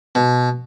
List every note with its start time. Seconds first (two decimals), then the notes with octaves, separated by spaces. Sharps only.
0.15 B2